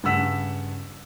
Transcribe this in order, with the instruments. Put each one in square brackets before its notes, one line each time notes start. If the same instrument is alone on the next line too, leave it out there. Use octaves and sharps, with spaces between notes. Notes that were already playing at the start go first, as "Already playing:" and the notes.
[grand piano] G2 C#3 F#5 E6 B6 E7